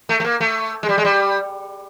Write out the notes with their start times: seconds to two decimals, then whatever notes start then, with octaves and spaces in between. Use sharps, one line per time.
0.09 A3
0.20 A3
0.24 A#3
0.40 A3
0.83 G#3
0.89 G3
0.98 G#3
1.05 G3